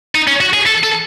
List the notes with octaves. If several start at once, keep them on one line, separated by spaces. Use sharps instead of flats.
D#4
C#4
F#4
G#4
A4
A4